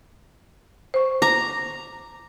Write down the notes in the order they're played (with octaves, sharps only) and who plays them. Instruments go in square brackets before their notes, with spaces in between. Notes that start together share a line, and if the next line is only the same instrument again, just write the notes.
[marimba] C5 C#6
[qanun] A#5 [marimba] D6